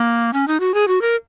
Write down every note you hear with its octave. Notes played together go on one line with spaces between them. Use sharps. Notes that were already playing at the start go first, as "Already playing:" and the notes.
Already playing: A#3
C#4
D#4
F#4
G#4
F#4
A#4